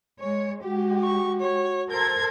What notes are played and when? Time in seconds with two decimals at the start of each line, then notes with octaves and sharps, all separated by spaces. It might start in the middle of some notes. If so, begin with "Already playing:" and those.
0.19 G#3 C#5
0.64 G#3 F#4 G4
1.03 C#6
1.40 C#5
1.91 A4 A#4 C5 G#6